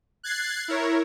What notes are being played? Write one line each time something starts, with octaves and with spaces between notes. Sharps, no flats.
F#6 G#6 A6 C7
E4 A#4 C#5